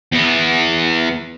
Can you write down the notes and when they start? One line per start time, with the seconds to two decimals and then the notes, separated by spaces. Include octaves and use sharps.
0.12 E2 B3